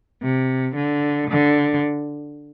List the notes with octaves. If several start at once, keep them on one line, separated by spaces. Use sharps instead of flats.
C3
D3
D3